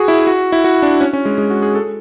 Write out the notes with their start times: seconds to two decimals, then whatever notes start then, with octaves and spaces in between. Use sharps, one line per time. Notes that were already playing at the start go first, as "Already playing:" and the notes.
Already playing: F#4 G#4
0.08 E4
0.27 F#4
0.52 E4
0.64 F#4
0.82 D4
1.01 C#4
1.13 C#4
1.25 G#3
1.38 G#3
1.50 F#4
1.62 G#4
1.75 A4